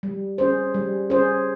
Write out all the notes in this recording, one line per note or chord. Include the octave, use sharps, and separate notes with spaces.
G3
C#4 G#4 C5
G3
C#4 G#4 C5